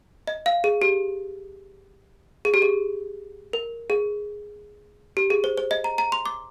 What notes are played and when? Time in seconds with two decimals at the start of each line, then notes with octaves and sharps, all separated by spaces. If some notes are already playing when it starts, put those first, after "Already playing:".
0.27 D#5
0.46 F5
0.64 G#4
0.82 G4
2.45 G#4
2.54 G4
2.62 G#4
3.53 A#4
3.90 G#4
5.17 G4
5.30 G#4
5.44 C5
5.58 C5
5.71 D#5
5.84 A#5
5.98 A#5
6.12 C6
6.26 D6